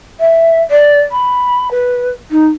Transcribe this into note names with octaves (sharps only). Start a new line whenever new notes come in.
E5
D5
B5
B4
D#4